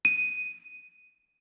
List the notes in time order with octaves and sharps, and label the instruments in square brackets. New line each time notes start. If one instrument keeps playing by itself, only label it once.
[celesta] D#7